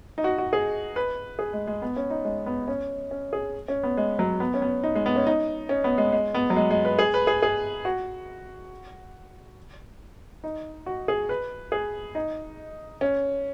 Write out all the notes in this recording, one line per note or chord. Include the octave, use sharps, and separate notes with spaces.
D#4
F#4
F#4
G#4
B4
G#4
G#3
G#3
B3
C#4
D#4
G#3
B3
C#4
C#4
G#4
C#4
B3
G#3
F#3
B3
C#4
B3
D#4
G#3
B3
C#4
D#4
C#4
B3
G#3
G#3
B3
F#3
G#3
G#3
B4
G#4
B4
G#4
G#4
F#4
D#4
F#4
G#4
B4
G#4
D#4
C#4